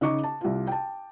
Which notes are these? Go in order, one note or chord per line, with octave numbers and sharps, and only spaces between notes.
C#3 D#4 D#5 C#6 D6
A5
C2 F4
G5 A5